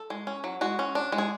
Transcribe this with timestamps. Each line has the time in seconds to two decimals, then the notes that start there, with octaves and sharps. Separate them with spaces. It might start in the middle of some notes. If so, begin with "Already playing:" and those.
Already playing: A4
0.10 G#3
0.27 C#4
0.44 F#3
0.61 G#3 F#4
0.79 C#4
0.95 D4
1.12 G#3
1.18 G#4